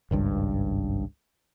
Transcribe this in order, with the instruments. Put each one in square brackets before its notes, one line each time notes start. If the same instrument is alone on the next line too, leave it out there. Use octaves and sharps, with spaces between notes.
[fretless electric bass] G#1 C#2 G2